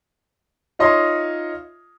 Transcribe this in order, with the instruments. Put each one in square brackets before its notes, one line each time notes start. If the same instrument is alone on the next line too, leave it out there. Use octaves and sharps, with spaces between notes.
[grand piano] D#4 F4 C#5 D#5 E5 C6